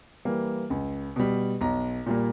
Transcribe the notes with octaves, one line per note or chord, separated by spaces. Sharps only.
E3 G3 A#3
C#2
B2 G3
B1 A#5
A#2 G3 A#3